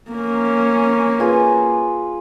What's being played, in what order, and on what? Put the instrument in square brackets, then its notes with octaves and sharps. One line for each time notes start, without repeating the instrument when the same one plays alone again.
[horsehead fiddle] A#3 C#4
[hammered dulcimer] F4 G#4 B4